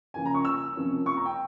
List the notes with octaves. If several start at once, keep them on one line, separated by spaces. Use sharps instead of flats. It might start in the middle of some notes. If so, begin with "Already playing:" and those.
C#3 F3 A#3 C#4 G#5
A#5
C#6
E6
C3 F3 A#3 C#4
C#6
A#5
G5